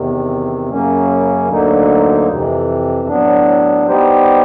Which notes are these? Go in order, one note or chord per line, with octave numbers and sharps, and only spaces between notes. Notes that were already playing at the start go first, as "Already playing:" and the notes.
Already playing: E2 C3 D#3
F#2 C#3 F#3 A#3 C#4
D2 D3 F#3 A#3 D#4
F2 C3 E3
A2 F#3 B3 D4
G3 B3 D#4 G4 C5